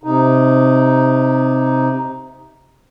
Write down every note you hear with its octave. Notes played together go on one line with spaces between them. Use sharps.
C3 D#4